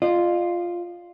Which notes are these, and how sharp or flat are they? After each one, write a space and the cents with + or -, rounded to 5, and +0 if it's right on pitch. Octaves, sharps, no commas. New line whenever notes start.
F4 +0 D#5 -40